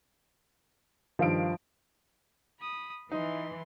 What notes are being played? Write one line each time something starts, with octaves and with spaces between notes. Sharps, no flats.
G2 D#3 F3 F5 D7
B5 D#6
E3 D#4 C6